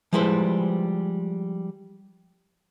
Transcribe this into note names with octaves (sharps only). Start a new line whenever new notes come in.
F3 G3 G#3 E4 B4 C5